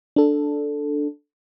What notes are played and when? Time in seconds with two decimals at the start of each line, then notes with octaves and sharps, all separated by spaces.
0.16 D4 A4